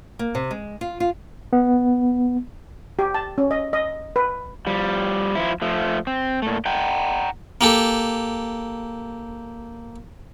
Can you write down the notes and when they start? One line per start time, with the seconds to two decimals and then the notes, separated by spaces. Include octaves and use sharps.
0.19 A#3
0.35 C3
0.51 G#3
0.81 F4
1.00 F4
1.53 B3
2.99 G4
3.14 A5
3.38 C#4
3.51 D#5
3.73 D#5
4.16 B4
4.67 F3 G3
5.35 F3 E4
5.62 F3 A3
6.07 C4
6.42 A#2 A3
6.66 F#5 G5 A#5
7.61 A#3 G4 A4